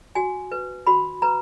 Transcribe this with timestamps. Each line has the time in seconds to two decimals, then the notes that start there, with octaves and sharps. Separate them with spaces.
0.15 F#4 G#5
0.52 B4
0.87 F#4 B5
1.22 B4 A#5